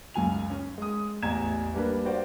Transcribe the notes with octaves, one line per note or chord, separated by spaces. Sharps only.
C#2 F#2 G#5 F7
C#4
G#3 D#6
A1 E2 A#5 G#6 E7
G3 A#3 D4 B4
F#4 C5 D5 F5 F#5